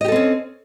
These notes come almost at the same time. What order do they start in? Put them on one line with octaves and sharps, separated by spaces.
D#5 G4 A4 C4 C#4